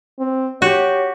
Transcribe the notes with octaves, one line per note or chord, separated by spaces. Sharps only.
C4
F#4 G4 C#5